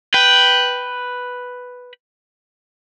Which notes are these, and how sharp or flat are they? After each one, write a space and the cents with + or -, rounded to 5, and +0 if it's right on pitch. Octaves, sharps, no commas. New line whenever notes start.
B4 +0 G5 -5